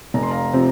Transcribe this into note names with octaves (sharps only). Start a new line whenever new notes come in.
F1 A#5
C6
F5 A#5
C3 F3 C4